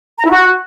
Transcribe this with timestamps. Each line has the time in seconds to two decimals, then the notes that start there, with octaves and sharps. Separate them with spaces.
0.19 A#5
0.24 E4
0.30 F#4